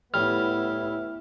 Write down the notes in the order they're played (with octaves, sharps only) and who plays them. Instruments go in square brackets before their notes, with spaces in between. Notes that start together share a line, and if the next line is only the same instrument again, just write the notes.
[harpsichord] A2 G3 [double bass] B3 E4 [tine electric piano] F6